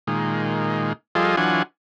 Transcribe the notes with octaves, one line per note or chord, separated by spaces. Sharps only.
A#2 D#3 G#3
F3 G3 F4 G#4 A4 D#5
E3 F#3 D4 F4 F#5 G#5